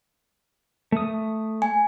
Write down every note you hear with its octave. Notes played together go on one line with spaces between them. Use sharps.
A3 D#6
G#5